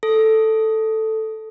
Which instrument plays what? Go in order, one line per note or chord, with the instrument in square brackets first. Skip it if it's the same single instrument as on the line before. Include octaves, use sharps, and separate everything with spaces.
[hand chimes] A4